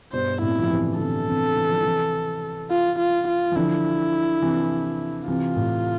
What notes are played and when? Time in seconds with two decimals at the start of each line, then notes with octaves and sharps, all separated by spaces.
0.13 G2 B2 C5
0.42 A2 C3 E4
0.59 F3
0.70 C3 E3
0.94 D3
0.99 C3 E3 A4
1.27 C3 E3
1.56 E3
1.69 F3
1.82 C3 E3
2.71 F4
2.99 F4
3.28 F4
3.52 E3
3.56 D3 F3 E4
4.42 C3 E3
5.28 C3 E3 F4
5.56 A2